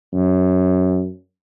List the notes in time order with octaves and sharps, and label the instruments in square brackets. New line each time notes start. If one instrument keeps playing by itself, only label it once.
[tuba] F#2